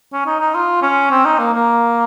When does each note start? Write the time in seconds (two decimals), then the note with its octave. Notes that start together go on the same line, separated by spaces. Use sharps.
0.13 C#4
0.26 D#4
0.40 D#4
0.55 F4
0.82 C#4
1.11 C4
1.25 D#4
1.39 A#3
1.53 A#3